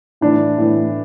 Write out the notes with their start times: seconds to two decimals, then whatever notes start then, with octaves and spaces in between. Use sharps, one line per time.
0.21 A2 E3 D4
0.58 A2 E3